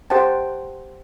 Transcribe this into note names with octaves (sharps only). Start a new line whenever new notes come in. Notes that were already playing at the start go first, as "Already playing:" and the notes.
G4 C5 F#5 G5 A5